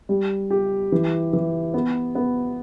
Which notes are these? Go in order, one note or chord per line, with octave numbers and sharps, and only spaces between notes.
G3
G4
E3
E3
B3
B3